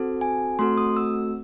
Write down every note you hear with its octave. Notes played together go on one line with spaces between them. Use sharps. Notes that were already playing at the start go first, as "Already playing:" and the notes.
Already playing: C4 F#4 A4
G#5
A3 C4 F#4 A4 C6
D#6
E6